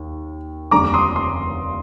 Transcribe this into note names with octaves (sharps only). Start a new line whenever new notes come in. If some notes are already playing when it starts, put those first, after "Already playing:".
Already playing: D#2
F1 D#2 D3 G3 D4 A#5 D6
C6 D#6
C6